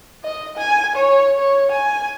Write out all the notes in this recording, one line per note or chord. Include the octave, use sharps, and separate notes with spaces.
D#5
G#5
C#5
C#5
G#5